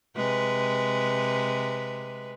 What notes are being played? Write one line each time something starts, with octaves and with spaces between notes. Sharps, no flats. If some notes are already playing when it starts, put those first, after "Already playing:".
C3 G#3 B4